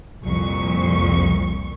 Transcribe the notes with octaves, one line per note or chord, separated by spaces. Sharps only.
C2 F2 A#2 C#6